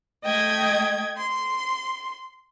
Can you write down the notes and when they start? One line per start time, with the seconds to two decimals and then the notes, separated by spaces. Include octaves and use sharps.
0.24 A3 D#5 G5 G#6
1.16 C6